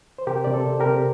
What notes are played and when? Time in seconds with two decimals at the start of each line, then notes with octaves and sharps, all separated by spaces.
0.18 C5
0.27 C3 G4 A#4
0.44 C3 D5
0.54 A4 C5
0.67 C3
0.80 G4 A#4
0.86 C3